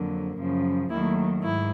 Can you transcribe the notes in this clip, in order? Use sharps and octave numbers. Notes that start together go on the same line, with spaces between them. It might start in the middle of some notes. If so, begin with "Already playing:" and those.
Already playing: F2 D3 F#3 A#3
F#2 C#3 F3
D#2 D#3 F#3 A3 E4
G#2 E4